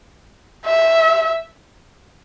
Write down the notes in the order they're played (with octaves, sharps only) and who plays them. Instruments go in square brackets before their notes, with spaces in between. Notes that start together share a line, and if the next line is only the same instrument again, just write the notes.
[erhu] E5